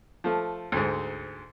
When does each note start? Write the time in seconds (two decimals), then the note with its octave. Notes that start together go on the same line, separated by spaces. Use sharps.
0.24 F3 A3
0.72 D2 G#2